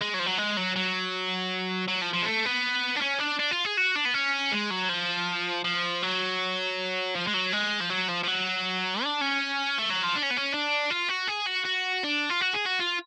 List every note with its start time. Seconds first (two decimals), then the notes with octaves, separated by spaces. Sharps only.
0.01 G#3
0.14 F#3
0.19 F3
0.26 F#3
0.38 G#3
0.57 F#3
0.76 F#3
1.88 F#3
2.02 F3
2.13 F3
2.22 G#3
2.26 A3
2.45 B3
2.96 D4
3.02 C#4
3.20 D4
3.40 D4
3.51 F4
3.65 G#4
3.77 F#4
3.96 D4
4.05 B3
4.14 C#4
4.52 G#3
4.71 F#3
4.89 F3
5.65 F3
6.03 F#3
7.15 F3
7.27 G#3
7.34 F#3
7.53 G#3
7.81 F3
7.90 F#3
8.08 F3
8.23 F3
8.27 F#3
9.03 D4
9.21 C#4
9.79 A3
9.90 F#3
10.04 F3
10.16 D4
10.23 C#4
10.31 B3
10.37 C#4
10.54 D4
10.91 F4
11.09 F#4
11.28 G#4
11.47 F#4
11.65 F#4
12.04 D4
12.30 F4
12.41 F#4
12.54 G#4
12.66 F#4
12.79 F4